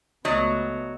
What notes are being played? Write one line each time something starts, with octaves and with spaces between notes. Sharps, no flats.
C#2 F#3 A3 B3 D5 D#5